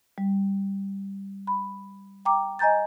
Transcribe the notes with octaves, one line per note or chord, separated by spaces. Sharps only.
G3
B5
G5 A#5 D6
D#5 G#5 A#5 G6 A6